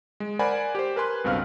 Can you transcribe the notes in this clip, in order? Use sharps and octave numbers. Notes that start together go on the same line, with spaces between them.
G#3
A#4 C5 D5 F#5 G#5 B5
G4 C5
A#4 B4 G#5 C6 F#6
C#2 G2 B2 C4 F5 F6